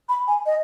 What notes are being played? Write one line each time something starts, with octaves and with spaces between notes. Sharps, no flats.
B5
G#5
D#5